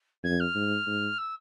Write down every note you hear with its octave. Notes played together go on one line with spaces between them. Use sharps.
F2 G#6
F6
G#2
G#2
E6